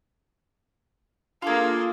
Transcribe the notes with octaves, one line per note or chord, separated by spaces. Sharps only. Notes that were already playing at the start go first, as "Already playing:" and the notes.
A#3 D4 F4 G#4 A4 D6 D#6